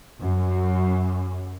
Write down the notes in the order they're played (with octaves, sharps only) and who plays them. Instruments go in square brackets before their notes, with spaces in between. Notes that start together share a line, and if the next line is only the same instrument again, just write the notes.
[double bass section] F#2